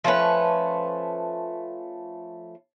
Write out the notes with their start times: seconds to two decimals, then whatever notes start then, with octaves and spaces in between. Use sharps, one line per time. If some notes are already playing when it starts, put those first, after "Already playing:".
0.04 F3 A3 C#4 B4